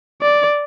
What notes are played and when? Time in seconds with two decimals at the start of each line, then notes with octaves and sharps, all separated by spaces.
0.22 D5